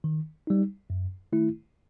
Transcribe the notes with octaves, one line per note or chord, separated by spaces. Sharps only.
D#3
G3 D#4
F#2
D#3 A3 E4